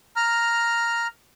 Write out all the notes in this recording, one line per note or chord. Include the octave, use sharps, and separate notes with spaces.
A#5 F6